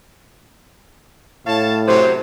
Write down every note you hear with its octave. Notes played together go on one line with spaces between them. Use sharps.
A2 C#5 F5 A5
F#2 C3 F#3 C5